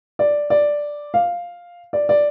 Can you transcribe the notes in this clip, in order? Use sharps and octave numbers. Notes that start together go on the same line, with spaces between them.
D5
D5
F5
D5
D5